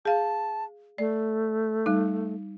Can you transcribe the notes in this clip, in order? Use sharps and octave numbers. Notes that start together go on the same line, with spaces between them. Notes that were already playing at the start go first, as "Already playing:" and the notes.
G#4 F5 A5
A3 D5
G3 D#4